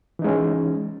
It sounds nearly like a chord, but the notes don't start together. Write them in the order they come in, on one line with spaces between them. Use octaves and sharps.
E3 D#4 G#3 C#4